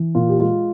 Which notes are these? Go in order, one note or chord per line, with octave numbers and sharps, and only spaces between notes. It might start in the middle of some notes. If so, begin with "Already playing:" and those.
Already playing: E3
A#2 F4
G4
G#3 F4